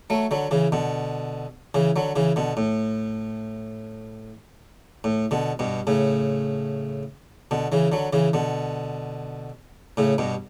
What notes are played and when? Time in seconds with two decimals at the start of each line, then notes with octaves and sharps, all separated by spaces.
0.10 F#3 A3
0.31 D3 F#3
0.51 C#3 E3
0.72 B2 D3
1.75 C#3 E3
1.96 D3 F#3
2.16 C#3 E3
2.36 B2 D3
2.57 A2
5.04 A2
5.31 B2 D3
5.59 G2 B2
5.87 A2 C#3
7.51 B2 D3
7.72 C#3 E3
7.92 D3 F#3
8.13 C#3 E3
8.33 B2 D3
9.97 A2 C#3
10.18 G2 B2